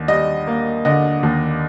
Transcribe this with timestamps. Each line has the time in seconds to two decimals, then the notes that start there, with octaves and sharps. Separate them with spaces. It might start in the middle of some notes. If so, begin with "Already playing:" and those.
Already playing: D#2 D3
0.08 G3 D#5
0.47 A#3
0.85 D3 D#5
1.23 D#2